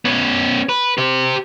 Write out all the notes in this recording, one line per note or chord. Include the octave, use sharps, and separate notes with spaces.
B3 C#4
B4
G4 C5